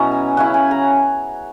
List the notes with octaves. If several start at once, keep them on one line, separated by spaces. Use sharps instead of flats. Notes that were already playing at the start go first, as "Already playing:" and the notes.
Already playing: B2 F#3 C#4 E4 A#5
G#5
C#3 F#3 C#4 E4 F#5
G#5
A#5